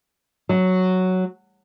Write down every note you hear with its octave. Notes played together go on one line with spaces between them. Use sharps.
F#3